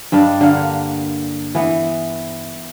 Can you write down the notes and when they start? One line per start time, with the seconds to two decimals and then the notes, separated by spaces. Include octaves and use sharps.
0.12 G2 G3 D4 D#5
0.41 D3 A#3
1.55 E3 B3